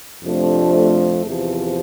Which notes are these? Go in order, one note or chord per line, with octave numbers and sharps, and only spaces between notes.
F2 C3 F3 A3 D4
E2 C3 F3